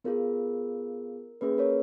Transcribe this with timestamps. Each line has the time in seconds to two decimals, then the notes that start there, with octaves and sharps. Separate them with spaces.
0.04 B3 F4 G#4 A#4
1.41 A#3 C#4 G#4 B4
1.58 A#4 C#5